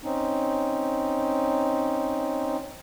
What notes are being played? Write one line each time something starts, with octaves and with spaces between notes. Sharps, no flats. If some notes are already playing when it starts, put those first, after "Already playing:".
C4 C#4 D#4